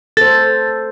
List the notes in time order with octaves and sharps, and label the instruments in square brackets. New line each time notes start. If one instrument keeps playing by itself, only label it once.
[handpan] A4 C5 [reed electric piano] A6